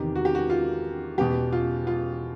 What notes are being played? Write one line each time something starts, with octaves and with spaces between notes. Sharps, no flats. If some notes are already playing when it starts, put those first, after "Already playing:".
Already playing: E2 C3 D#3 G4
F#4
G4
F#4
F4
E2 B2 G4
F4
F4